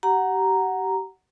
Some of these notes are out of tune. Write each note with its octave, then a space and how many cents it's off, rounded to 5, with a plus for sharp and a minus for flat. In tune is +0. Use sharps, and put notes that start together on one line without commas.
G4 -30 F#5 +0 A#5 +0